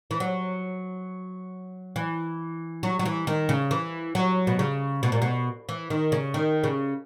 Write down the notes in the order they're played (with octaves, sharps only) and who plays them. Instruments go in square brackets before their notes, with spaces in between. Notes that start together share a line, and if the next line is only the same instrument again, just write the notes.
[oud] E3
F#3
E3
F#3
F#3
E3
D#3
C#3
E3
F#3
B2
C#3
B2
A#2
B2
E3
D#3
C#3
D#3
C#3